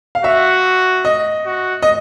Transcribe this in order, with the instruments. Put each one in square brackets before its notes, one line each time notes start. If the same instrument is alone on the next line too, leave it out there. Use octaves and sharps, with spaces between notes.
[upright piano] F5
[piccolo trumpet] F#4 [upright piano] E5
[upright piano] D#5
[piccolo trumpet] F#4
[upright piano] D#5